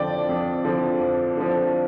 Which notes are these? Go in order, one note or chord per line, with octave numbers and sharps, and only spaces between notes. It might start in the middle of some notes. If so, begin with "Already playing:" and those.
Already playing: F2 D3 F3 D5 G5
F2
D3 F3
F2
D3 F3